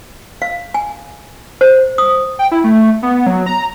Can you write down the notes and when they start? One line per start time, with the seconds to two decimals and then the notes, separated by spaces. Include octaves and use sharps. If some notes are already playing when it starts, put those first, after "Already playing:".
0.42 F5
0.74 G#5
1.61 C5
1.98 D#6
2.39 G5
2.52 E4
2.64 A3
3.03 B3
3.27 F#3
3.46 A#5